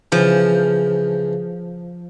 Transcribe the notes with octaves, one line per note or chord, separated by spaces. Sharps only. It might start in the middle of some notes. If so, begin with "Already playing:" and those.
C#3 E3 F3